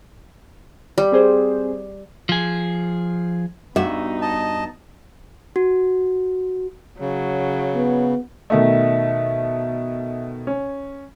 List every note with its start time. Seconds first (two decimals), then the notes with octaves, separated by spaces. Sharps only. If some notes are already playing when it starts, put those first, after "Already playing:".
0.98 G3
1.12 C4 G#4 C5
2.29 F3 G#4
3.76 G2 B3 D#4 F#4 E5
4.22 D#5 A5
5.56 F#4
7.00 C#3 F#3
7.74 B3
8.50 B2 D#3 A3 D#5 E5
10.47 C#4